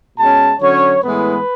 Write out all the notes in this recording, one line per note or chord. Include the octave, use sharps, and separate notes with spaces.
B2 G#3 C#4 A5
D3 F#3 C#4 C#5
A2 E3 G#3 B3 B4